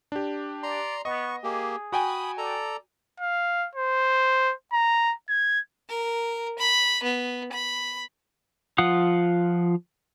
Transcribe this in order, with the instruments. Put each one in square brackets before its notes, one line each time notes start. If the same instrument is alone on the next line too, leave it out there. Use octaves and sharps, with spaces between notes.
[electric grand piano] D4 G4
[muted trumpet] D5 [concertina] A#5 C6
[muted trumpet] B3 [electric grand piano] D#5 [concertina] C#6
[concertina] A#3 G4 [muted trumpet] G#4
[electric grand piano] F#4 G5 G#5 [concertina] B5 D#6
[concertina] A4 A#5 [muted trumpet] D5
[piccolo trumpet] F5
C5
A#5
G#6
[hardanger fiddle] A#4
B5
B3
B5
[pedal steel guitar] F3 F4 F5 F#5 D#6